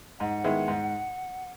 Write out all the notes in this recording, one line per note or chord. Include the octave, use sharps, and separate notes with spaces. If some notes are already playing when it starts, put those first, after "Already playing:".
G#2 F#5
D#3 G#3 B3 E4
G#2